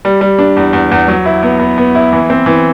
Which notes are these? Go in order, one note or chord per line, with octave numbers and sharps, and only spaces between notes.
G3
G3
D4
E2
E2
E2
F#3
E4
B3
B3
B3
E4
E3
C4
E3